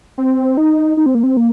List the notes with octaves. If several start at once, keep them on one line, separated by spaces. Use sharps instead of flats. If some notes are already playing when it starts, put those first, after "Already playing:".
C4
D#4
D#4
C4
A#3
C4
A#3